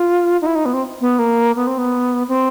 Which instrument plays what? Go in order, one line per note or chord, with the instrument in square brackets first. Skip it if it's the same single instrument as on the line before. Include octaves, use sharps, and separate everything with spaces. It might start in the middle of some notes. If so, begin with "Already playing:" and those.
Already playing: [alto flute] F4
D#4
E4
D#4
B3
C4
B3
A#3
B3
C4
B3
C4